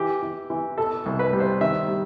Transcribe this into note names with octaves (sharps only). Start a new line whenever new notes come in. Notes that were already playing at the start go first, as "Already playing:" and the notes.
Already playing: E3 G4
E3
E3
B2 A4
C2
B4
G3
C5
D#3 E5
G3